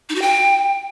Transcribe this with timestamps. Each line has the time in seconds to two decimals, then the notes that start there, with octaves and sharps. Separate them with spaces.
0.09 D#4
0.15 F#4
0.22 G5